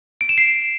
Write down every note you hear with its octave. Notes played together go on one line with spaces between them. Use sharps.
D7
E7
C7